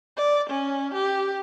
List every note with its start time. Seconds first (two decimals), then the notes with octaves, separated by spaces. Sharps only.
0.17 D5
0.50 C#4
0.94 G4